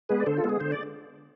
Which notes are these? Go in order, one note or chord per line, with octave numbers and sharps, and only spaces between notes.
G#3 B3 G#4 B4
D5
D3 A4 C5
F4 A4
G#3 B3
G#4
D3 C5
D5